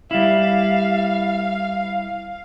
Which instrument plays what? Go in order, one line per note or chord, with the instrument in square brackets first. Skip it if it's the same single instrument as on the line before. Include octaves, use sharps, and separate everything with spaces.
[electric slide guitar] G3 E4 [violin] F5